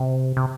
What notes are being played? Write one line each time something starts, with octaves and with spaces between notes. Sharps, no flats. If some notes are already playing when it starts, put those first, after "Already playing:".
Already playing: C3
C3